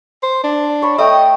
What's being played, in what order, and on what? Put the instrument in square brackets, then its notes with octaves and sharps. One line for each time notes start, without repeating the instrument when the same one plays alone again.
[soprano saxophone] C5
D4
[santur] C#5 B5
[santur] A3 G5 [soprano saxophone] D#5